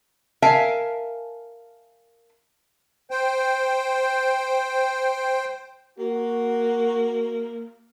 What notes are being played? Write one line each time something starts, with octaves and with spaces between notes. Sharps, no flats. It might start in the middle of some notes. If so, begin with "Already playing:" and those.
A#4 E5 F5 G#5 A5
C5 G5
A#3 F#4